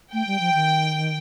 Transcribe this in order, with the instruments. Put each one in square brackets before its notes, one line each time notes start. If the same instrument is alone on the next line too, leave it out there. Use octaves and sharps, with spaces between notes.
[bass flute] A3 [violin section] G5
[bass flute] G3
F3
D#3